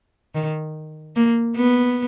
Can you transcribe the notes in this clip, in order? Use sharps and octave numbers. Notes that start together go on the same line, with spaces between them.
D#3
A#3
B3